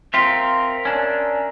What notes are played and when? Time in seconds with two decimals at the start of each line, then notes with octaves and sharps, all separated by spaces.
0.14 C4 F4 A#4 E5
0.85 C#4 D4